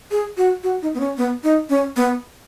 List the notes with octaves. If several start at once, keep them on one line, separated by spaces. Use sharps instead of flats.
G#4
F#4
F#4
D#4
B3
C#4
B3
D#4
C#4
B3